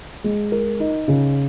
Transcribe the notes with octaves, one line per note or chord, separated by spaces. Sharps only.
G#3
A#4
D#4
C#3